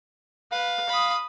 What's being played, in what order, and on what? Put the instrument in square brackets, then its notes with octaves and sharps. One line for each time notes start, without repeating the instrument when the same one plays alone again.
[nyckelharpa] B4 [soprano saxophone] F5
[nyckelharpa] B5 D#6